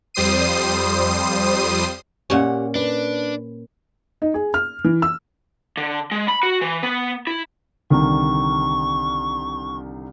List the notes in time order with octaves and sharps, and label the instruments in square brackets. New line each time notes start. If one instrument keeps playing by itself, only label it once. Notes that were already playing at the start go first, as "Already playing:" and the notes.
[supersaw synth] F2 G3 C5 D#6 C7 D#7
[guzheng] A#2 C#4 [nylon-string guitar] G4 F#5
[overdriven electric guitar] D4 [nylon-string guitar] B4
[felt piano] D#4
G#4
F6
E3
E6
[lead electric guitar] D3
G#3
B5
F#4
E3
B3
E4
[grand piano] C2 D3 D#3 [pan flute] C#6